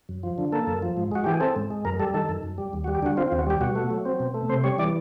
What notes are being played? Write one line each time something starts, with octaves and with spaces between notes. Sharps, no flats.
F#2
F3
D3
A#3 A4
F#2
F3
G#2
G#3 F#4
E3 G4
G#4
C4 A4
G#2
G#3
F#2 A#4
G3 A4
D#3 A4
F#2
F#2
G3
D#2
F#4
G3
G4
D3 F#4
C4 F4
F4
D#2
F#4
G3 G4
B2 F#4
A3
F#3
C4
B2
A3
C3 C5
G3 C#5
E3 D5